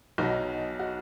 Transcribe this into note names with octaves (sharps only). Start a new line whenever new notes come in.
B1 B2 F#3 D#4
F#4